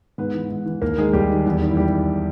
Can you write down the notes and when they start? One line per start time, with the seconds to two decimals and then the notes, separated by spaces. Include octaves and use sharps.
0.18 G#2 B3 B4
0.34 E3
0.50 G#2
0.66 E3
0.82 D#2 A#3 A#4
0.97 D#3 G#3 G#4
1.13 D#2 G3 G4
1.30 D#3
1.46 E2
1.61 D#3
1.71 E4
1.77 G3 G4